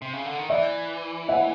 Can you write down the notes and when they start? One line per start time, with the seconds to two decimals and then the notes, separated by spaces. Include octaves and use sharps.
0.02 C3
0.13 C#3
0.26 D3
0.38 D#3
0.50 E3 D5 E5
1.29 E5 F#5